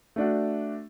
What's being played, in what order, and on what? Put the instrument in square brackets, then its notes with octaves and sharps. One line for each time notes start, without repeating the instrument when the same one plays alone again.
[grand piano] A3 D4 F#4